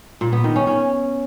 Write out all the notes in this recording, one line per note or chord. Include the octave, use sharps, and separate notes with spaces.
A#2
B3
D#3
C#4
C#4